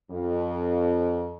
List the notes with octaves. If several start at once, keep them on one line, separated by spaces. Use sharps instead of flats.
F2